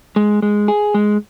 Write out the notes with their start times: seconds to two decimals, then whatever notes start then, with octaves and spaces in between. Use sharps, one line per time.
0.16 G#3
0.42 G#3
0.68 G#4
0.94 G#3